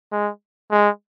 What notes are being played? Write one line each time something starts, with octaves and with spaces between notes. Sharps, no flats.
G#3
G#3